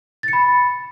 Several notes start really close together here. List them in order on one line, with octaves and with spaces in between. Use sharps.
A6 C#7 B5